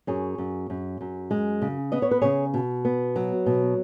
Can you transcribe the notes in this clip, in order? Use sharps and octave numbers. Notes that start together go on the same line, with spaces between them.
F#2 G#4 C#5
F#2
F#2
F#2
G#3
C#3
B3 D#5
C#5
B4
C#3 G#4 C#5
B2
B3
F#3
B2